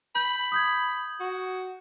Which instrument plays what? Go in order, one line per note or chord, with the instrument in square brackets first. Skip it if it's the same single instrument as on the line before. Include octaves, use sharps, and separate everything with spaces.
[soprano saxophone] B5 [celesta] G6
[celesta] D#6 G6 G#6
[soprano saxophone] F#4